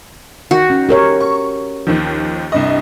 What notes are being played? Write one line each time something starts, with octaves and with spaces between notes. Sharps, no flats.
D#3 F#4
C#4
G4 A#4 C#5
C#6
D#2 D#3 F3
C2 G2 D#5